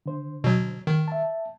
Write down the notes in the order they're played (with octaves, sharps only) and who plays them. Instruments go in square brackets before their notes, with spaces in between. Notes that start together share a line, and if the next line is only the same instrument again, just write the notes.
[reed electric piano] D3 C5
[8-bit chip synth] B2 F#3
D#3
[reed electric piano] E5 A5